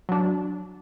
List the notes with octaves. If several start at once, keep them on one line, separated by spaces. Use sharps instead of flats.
F#3 D4